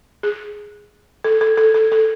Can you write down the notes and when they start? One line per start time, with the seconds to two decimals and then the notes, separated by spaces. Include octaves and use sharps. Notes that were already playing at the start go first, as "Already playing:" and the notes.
0.23 G#4
1.24 A4
1.41 A4
1.57 A4
1.74 A4
1.92 A4